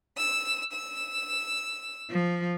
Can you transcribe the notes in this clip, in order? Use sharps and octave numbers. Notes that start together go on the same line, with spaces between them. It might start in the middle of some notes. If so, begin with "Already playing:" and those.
E6
E6
F3